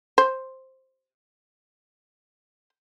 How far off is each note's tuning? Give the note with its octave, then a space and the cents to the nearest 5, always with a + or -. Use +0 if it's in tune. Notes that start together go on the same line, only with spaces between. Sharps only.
C5 +5